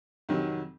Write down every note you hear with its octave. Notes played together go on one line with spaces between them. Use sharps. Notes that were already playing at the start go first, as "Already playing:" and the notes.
F2 C3 D#3 F#3